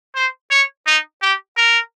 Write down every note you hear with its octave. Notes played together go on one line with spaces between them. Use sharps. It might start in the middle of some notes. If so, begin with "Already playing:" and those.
C5
C#5
D#4
G4
A#4